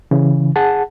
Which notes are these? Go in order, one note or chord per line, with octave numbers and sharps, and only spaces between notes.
C#3 E3
G#4 F#5 A5